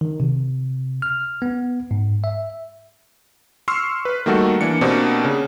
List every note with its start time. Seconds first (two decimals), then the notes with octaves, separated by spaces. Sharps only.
0.01 D#3
0.20 C3
1.02 F6
1.42 B3
1.91 G#2
2.24 E5
3.68 C6 C#6 E6 F6 C7
4.05 B4
4.26 D#3 G3 A3 A#3 F#4 A4
4.61 E3 A#3 D4 C#7
4.81 B2 A#3 C4 D4 G4
5.24 C#3